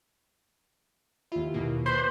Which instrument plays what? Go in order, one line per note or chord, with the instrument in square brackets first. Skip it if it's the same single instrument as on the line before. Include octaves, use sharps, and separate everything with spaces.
[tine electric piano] D#2 E4 [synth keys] F4
[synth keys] B2 A#3
[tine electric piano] B4 B5 [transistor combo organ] C5 [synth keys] C6 D6